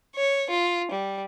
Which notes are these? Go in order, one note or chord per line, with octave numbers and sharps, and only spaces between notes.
C#5
F4
G3